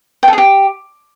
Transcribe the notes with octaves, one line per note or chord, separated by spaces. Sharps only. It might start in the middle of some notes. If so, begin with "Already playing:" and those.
G5
A4
G#4
G4